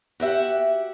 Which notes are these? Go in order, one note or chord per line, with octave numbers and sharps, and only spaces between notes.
F#4 G4 E5 F#5